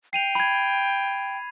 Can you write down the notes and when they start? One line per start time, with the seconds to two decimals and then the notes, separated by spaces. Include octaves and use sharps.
0.13 G5 C7 D#7 F7
0.35 B5 G#6